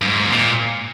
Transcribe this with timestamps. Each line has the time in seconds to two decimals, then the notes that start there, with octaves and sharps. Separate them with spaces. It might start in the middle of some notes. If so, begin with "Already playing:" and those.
0.01 G2
0.08 G#2
0.25 B2
0.31 A#2